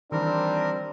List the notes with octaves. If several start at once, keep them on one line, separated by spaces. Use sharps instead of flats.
D#3 E3 G3 C4 D4 A#4